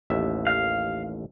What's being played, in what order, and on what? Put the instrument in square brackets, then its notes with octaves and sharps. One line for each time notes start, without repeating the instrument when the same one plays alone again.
[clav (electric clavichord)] A1 D#2 E5
[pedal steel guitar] F5